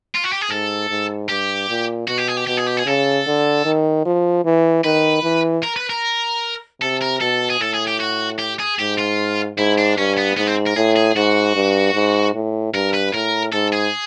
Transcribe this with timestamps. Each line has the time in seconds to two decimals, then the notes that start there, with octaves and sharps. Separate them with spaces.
0.15 F4
0.24 F#4
0.33 G4
0.42 G#4
0.50 G#2 A4
0.90 G#2
1.29 G2 G4
1.69 A#2
2.08 B2 F#4
2.18 G4
2.28 G#4
2.37 G4
2.47 B2 G4
2.57 G#4
2.67 G4
2.77 G#4
2.86 C#3 A4
3.27 D3
3.65 D#3
4.05 F3
4.45 E3
4.84 D#3 B4
5.23 E3
5.63 A#4
5.76 B4
5.90 A#4
6.81 C3 A4
7.02 A#4
7.21 B2 A4
7.50 G#4
7.60 A2 A4
7.74 G#4
7.87 G4
8.00 F#4
8.39 G4
8.59 G#4
8.79 G#2 G4
8.98 F4
9.57 G#2 E4
9.78 D4
9.97 G2 C#4
10.17 B3
10.37 G#2 B3
10.47 C4
10.66 A#4
10.76 A2 G#4
10.96 G#4
11.16 G#2 F#4
11.56 G2
11.94 G#2
12.35 A2
12.73 G2 A#4
12.94 B4
13.13 A2 A#4
13.52 G#2 A4
13.73 G#4